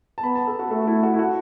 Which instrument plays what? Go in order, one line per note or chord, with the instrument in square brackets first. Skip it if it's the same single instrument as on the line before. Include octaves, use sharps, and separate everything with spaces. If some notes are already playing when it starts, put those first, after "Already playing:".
[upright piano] A5
[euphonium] B3 [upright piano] B5
[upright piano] A5
A4
F#4
[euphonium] A3 [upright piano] A4
[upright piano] E4
F#4
E4
F#4